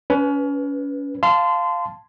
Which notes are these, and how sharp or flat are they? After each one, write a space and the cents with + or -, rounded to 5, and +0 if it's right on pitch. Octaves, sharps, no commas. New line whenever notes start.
C#4 +30 B4 +0
F5 +0 A5 +0 C6 -25